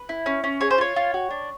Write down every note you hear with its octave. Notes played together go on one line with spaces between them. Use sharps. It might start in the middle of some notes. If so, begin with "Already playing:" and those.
Already playing: B4
E4
C#4
C#4
G#4 C#5
C5
F4 C#5
F4
F#4
D4